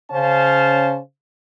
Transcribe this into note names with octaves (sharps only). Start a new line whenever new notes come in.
C#3 C#4 C5 F5 A5